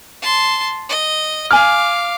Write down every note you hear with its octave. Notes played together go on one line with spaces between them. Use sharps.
A5 C6
D#5
F5 G#5 D6 F6